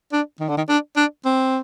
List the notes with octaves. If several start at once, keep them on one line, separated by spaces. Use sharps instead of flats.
D4
D#3
D3
D#3
D4
D4
C4